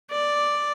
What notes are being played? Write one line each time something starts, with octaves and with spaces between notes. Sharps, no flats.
D5